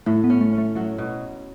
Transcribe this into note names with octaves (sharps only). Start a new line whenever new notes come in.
A2 A3
B3
C#4
A3
C#4
A3
F#3 A3
B2